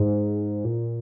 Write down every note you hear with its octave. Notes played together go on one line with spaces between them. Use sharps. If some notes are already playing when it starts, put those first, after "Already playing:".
Already playing: G#2
A#2